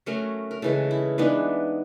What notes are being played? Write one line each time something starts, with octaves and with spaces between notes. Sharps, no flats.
F#3 A3 C#4 A#4
A#4
C#3 E3 G#3 A4
E4
E3 G#3 B3 D4 D#4